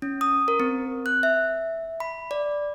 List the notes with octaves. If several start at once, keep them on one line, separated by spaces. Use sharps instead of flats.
C#4
D#6
A#4
C4
F#6
E5
B5
D5